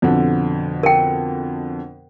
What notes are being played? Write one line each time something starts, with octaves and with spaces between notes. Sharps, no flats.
F2 B2 D3
A#4 G5